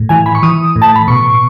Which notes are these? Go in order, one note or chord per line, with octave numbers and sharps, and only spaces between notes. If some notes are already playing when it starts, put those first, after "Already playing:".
Already playing: A2
E3 G#5
B5
C#6
E3 D#6
A2
A5
B5
B2 C#6